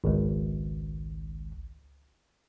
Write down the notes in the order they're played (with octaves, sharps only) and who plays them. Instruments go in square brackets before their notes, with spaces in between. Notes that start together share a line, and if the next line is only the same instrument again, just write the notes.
[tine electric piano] G#1 C#2